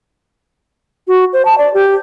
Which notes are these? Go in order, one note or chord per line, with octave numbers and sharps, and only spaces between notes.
F#4
C5
A5
D5
G4